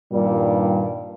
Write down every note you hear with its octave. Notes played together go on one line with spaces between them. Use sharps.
G2 A#2 D#3 G3